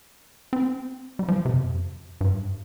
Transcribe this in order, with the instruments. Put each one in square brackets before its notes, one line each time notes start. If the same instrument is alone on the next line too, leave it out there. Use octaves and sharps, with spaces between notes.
[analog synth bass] C4
G3
F3
C3
F2
G2